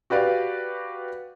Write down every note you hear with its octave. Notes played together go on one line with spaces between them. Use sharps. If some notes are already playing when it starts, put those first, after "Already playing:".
F#4 G4 B4 D5 F5